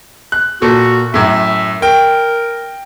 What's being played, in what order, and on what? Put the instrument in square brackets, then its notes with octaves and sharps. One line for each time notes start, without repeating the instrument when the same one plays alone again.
[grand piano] F#6
[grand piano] A#2 A4 [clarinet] F#4
[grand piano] F#2 A2 [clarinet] E5
[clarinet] A#4 [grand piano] G5